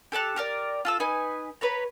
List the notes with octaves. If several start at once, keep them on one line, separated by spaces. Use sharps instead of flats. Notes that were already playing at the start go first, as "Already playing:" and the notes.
G4 A4 A5 F#6
G4 A#4 D5
F4 A4 E6
D#4 B4 G#5
B4 C#5 A#5